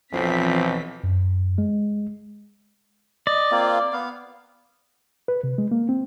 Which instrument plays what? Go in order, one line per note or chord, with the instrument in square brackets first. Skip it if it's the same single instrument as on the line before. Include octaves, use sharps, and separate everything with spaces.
[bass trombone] B1 [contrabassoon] F2 [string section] E3 F3 B6 [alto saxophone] C4
[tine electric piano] F#2
G#3
[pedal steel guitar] D5 [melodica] D#5
[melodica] A#3 C4 F4
B3 F5
[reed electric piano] B4
C3
G#3
A#3
C4